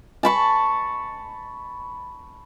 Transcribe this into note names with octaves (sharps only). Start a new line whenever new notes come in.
A5 B5 C#6